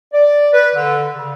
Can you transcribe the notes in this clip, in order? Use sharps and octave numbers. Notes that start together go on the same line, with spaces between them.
D5
B4
D3
C#3